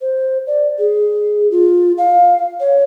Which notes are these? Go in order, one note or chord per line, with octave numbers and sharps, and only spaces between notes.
C5
D5
G#4
F4
F5
C#5